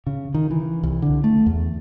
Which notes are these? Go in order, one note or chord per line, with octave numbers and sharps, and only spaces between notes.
C#3
D#3
E3
C2
D3
A3
E2